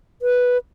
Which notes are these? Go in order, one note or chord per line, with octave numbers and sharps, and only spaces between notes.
B4